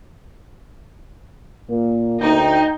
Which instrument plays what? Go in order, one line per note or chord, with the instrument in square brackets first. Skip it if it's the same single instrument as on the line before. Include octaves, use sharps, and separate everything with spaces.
[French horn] A#2 [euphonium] A#3
[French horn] D2 [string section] D#4 [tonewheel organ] G5